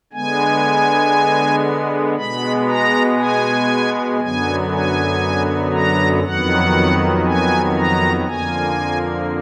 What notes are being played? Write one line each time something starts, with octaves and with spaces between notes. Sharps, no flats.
D3 G#3 B3 G#5
B2 G#3 B3 B5
A#5
G#5
F#2 D3 F#3 B3 G#5
G#5
A#5
F2 D#3 F#3 B3 F#5
G#5
A#5
F2 D3 F3 A#3 G#5